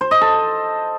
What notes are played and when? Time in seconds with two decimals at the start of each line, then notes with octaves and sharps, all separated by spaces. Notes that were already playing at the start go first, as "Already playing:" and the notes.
0.01 C5
0.11 D#5
0.21 A4